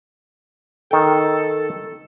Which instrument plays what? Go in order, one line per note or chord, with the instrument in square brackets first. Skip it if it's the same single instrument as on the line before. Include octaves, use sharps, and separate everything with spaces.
[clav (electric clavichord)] D#3 G5 [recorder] A4